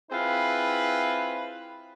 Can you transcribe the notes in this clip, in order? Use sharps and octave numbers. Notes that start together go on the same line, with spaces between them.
C4 E4 F4 G#4 B4